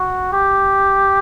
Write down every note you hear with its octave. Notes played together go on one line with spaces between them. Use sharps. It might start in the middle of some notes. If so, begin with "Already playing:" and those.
Already playing: F#4
G4